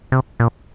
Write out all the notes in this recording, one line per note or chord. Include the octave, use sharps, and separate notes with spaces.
C3
A#2